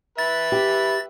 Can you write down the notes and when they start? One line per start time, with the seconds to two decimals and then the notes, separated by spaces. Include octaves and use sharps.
0.19 B4 E5 A6
0.52 G4